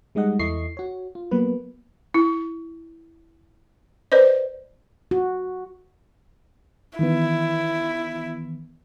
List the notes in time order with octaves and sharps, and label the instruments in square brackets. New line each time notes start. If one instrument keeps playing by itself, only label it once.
[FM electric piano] G3 G#3 D#4 D#5 F#5
E2 E4 A4 D#5 C#6 C7
F#4 C#5
F4
F#3 A#3 B3 B4
[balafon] E4
B4 C5 D5 D#5
[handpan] F#4
[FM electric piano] D#3 E3 B3 [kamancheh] E4